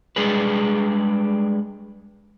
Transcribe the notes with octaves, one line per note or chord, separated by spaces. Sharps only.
G3 G#3 D4 G#4 B4